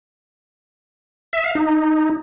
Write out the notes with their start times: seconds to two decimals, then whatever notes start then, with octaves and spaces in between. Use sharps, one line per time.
1.33 E5
1.44 F5
1.55 D#4